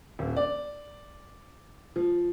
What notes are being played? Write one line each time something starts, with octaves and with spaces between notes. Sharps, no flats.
D#1
D5
F3